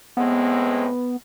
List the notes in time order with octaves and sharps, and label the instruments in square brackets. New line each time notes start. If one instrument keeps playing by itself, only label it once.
[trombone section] A2 G#3 C4 [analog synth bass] B3